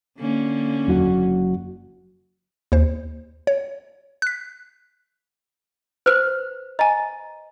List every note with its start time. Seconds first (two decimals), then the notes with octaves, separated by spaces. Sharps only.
0.18 D3 A#3 C#4
0.87 F#1 F#4
2.72 D#2 C5
3.47 C#5
4.22 F#6 B6
6.06 B4 C5 E6 F6
6.79 D#5 G#5 A#5